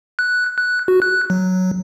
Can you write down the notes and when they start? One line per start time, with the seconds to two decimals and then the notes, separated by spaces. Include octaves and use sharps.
0.19 F#6
0.58 F#6
0.88 F#4
1.02 F#6
1.30 F#3